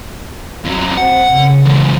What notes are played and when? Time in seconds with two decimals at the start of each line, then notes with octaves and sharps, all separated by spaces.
0.65 F2 F#3
0.97 C4 F#5
1.31 C#3
1.66 E2 G#2